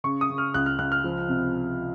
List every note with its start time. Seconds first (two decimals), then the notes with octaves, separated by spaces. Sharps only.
0.04 C#3 C#6
0.21 D#6
0.29 C#3
0.38 F6
0.54 C#2 F#6
0.66 F6
0.79 C#2 F#6
0.92 F6
1.04 F3
1.29 C3